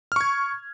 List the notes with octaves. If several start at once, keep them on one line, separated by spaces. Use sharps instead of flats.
C#6 F6 G#6